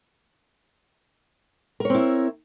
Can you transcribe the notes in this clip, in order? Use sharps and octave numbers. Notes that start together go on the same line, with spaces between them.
C4 E4 A#4 C#5